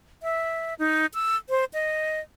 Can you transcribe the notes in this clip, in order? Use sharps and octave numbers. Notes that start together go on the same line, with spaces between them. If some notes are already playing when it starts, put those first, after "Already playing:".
E5
D#4
E6
C5
D#5